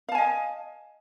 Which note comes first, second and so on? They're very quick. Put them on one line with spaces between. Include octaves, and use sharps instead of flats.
F5 A5 G#5 D#5